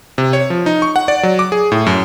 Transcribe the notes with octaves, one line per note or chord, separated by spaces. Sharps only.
C3
C#5
F3
D#4
C#6
F#5
D5
F#3
D6
G#4
A2
F#2